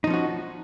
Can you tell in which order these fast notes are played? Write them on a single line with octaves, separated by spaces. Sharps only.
D#4 F3 C#4 F#4